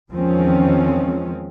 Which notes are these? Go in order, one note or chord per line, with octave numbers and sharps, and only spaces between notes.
E2 D#3 F3 G#3 C4 C#4